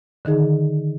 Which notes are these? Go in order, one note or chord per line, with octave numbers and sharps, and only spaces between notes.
D3 D#3 D#4 G#4